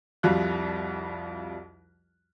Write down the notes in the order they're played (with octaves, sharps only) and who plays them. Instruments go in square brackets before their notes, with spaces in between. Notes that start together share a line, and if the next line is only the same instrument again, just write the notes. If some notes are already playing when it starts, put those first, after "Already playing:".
[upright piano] C2 F2 G3 F4 F#4 F#6